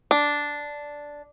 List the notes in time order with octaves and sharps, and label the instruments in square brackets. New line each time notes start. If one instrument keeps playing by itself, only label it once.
[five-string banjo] D4